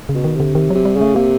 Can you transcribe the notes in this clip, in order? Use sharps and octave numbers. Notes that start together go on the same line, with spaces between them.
C#3
B2
D#3
C3
D3
C3 D#3
F#3
C3
G3
C#3 A3
C3 A#3